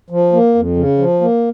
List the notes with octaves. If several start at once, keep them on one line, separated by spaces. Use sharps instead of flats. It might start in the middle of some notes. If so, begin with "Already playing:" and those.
F3
A#3
F2
C#3
F3
A#3